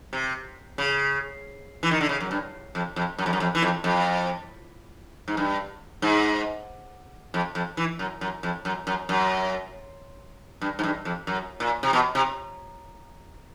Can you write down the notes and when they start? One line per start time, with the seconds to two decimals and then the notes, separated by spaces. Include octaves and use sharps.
0.13 C3
0.78 C#3
1.83 E3
1.91 D#3
2.01 D3
2.09 C#3
2.20 F#2
2.31 G2
2.75 F2
2.96 F2
3.19 F#2
3.26 F2
3.33 F#2
3.40 F2
3.55 E3
3.62 F2
3.84 F2
5.28 G#2
5.37 G2
6.02 G#2
7.34 F2
7.55 F2
7.77 E3
7.99 F#2
8.21 F#2
8.43 F2
8.65 F#2
8.87 F#2
9.09 F#2
10.61 G2
10.79 G#2
10.84 G2
11.05 F2
11.27 F#2
11.60 A#2
11.83 C3
11.93 B2
12.15 C3